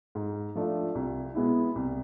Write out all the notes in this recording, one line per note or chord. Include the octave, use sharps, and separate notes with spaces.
G#2
F3 A3 D4 F4
C2
B2 G#3 B3 E4
C2